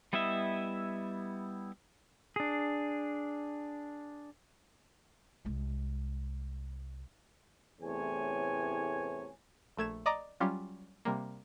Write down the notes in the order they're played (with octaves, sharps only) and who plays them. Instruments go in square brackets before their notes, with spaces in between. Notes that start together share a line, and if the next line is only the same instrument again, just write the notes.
[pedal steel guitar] G3 B3 E4 D#5 E5
[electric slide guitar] D4 G#4
[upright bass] C2 G#3
[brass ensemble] A1 E2 A2 C3 C#5 G#5
[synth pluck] A#1 A3 G#6 E7
D5 D#5 A#5 D6
F#3 G3 C#4 F4 G4
C3 G3 A#3